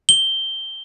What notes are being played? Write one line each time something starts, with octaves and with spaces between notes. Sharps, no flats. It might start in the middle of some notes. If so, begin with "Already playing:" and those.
G7